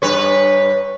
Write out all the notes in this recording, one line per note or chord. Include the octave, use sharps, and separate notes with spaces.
G2 B4 C#5